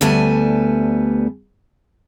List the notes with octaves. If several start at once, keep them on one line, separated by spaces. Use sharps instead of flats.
D2 G3 A3 B3 G#5 A5